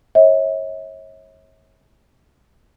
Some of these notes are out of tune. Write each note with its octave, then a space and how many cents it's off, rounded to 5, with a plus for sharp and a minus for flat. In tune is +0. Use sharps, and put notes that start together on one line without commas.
C#5 -30 E5 -45